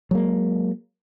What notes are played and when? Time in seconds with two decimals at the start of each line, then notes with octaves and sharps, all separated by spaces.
0.11 F#3 G#3 A#3